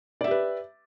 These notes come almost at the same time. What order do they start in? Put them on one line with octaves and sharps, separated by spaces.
D5 E5 G4 B4